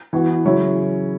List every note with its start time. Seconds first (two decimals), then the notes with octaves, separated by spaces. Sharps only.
0.13 E3 B3 F#4
0.44 C#3 F#3 C#4 E4